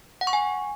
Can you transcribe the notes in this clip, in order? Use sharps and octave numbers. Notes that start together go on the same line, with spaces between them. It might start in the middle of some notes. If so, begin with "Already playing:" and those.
F#5
C#6
G#5